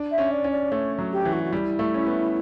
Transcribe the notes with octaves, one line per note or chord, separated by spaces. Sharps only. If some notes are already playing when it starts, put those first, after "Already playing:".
Already playing: D4
E5
C#4
D5
C#4
D5
A3 C#5
F#3
G4
E3
F#4
F#4
G3 E4
A3
C#4
B3